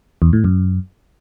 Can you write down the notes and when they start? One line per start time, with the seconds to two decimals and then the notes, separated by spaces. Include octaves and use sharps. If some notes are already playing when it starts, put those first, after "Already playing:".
0.22 E2
0.33 A2
0.44 F#2